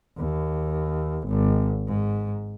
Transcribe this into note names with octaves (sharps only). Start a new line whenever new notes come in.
D#2
G#1
G#2